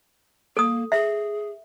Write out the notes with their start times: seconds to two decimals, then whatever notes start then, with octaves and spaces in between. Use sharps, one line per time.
0.57 A#3 A4 D#6
0.92 G#4 E5